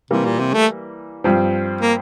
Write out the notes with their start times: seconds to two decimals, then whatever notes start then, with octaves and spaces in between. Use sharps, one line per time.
0.11 C3 E3 G3 A#3
0.25 A#2
0.39 C3
0.54 A3
1.24 G2 F3 C4
1.81 A#3